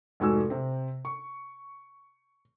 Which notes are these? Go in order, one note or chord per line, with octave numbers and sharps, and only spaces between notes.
F1 G#2 F#4 G#5 E6
C3 C4
C#6